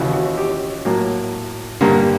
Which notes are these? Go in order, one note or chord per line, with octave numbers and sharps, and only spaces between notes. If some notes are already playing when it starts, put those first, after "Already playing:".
Already playing: D#2 C#3 E3 F#4
F#4
G4
A2 F#3 A#3
G2 D3 G3 A#3